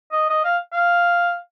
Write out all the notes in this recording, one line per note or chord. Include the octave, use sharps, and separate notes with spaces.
D#5
D#5
F5
F5